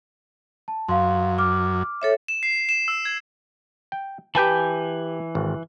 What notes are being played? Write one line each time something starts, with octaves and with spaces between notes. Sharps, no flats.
A5
F#2 F5 C6
D6 F6
A4 C#5 E5
E7
C7
E7
E6
G#6
G5
E3 G4 B4 G#5 A5 G6
G#1